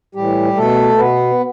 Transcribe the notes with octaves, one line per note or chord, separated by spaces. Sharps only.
A2 E3 G3 G4
B2 A3 A4
B2 B3 B4